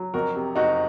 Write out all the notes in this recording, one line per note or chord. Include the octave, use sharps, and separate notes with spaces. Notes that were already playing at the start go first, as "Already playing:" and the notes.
Already playing: F#3
F2 F#4 A#4
C3
F#1 D#4 F#4